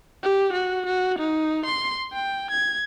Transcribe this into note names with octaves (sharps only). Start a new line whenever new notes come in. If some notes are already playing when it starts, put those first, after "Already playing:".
G4
F#4
F#4
D#4
C6
G5
G#6